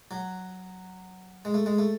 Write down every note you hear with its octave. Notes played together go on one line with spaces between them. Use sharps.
F#3
G#3
A3
G#3
A3